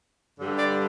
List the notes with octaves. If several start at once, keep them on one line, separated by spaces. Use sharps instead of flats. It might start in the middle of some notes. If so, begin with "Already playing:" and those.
G2 D3 G3
D5